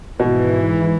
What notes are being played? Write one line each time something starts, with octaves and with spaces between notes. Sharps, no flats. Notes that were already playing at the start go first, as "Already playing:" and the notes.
G#1 G#2 B2 E3